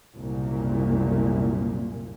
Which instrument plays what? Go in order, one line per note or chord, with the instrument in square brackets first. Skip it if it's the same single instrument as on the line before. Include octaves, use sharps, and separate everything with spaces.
[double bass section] F#1 C2 A#2